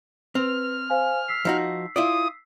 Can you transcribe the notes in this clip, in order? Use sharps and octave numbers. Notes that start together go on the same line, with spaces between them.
C4 B4 F6 F7
C5 F5 G#5
E6 B6 C7
F3 D#4 F#4
E4 F4 D5 D#6